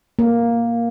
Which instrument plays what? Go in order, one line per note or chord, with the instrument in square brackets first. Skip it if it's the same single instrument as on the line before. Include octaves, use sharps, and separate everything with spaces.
[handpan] A#3